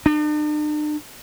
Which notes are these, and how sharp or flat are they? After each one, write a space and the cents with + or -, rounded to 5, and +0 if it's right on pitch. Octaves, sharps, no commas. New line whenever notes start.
D4 +45